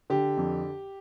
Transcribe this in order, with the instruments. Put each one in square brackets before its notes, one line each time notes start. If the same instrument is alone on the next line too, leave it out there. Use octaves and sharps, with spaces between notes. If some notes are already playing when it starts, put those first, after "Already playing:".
[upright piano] D3 G4
F2